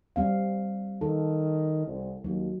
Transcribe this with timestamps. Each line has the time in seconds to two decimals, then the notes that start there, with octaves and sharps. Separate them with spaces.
0.16 G3 C4 F5
1.01 D#3 A4
1.87 C2
2.24 D#2 F#3